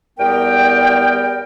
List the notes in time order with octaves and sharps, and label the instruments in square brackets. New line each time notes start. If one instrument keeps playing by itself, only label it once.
[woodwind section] E2 G3 B3 A#4 G5